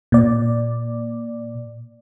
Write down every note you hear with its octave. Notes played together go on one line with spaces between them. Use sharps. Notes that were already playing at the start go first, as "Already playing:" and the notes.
A#2 D5